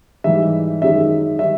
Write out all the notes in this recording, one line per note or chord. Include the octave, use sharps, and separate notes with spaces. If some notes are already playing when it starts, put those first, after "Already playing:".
G#2 E3 G3 E5
F#2 D#3 G#3 E5
D#3 G3 E5